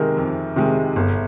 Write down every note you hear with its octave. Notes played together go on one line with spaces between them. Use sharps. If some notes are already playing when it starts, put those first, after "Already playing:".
Already playing: C3 D#3 G#3 A#4
F2
C3 D#3 G#3
G1